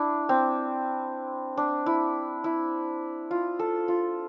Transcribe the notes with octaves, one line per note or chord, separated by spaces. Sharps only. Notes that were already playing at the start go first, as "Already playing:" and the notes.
Already playing: D4 E4
C4
D4
E4
E4
F4
A4
F4